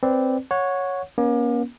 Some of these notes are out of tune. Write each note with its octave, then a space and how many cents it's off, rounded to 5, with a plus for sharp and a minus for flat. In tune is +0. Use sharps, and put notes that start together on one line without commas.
C4 +0 B4 +10 D5 +0
C#5 +0 F#5 -20
A#3 +40 C#4 +0